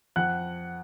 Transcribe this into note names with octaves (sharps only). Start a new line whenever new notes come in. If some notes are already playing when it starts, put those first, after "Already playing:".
F2 F#5 F#6